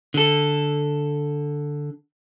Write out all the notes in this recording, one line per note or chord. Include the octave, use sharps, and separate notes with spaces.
D3 A4